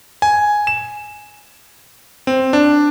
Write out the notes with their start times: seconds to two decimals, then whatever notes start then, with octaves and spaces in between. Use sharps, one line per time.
0.22 G#5
0.67 E7
2.27 C4
2.53 D4